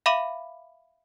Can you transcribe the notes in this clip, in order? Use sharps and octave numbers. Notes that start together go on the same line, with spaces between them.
E5 F5 B5 D6 D#7 F#7